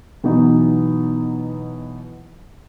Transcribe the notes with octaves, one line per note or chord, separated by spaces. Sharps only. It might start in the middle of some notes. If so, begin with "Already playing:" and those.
B2 E3 F#3 B3 D#4